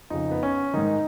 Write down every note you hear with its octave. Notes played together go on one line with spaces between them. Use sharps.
F2 C#3 D#4
B3
C#4
G#2 D#3 D#4